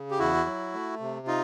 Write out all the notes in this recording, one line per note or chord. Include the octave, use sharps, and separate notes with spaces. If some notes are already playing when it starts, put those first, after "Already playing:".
Already playing: C#3
G4
E2 E4 F#4
F#3
A3
C3
D#4 F4